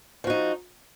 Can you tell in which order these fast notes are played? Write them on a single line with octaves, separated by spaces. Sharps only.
F3 F#4 D#4